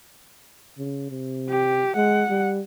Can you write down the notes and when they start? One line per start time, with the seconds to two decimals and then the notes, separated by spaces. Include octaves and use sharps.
0.78 C#3
1.11 C3
1.49 G4
1.96 G#3 F#5
2.30 G3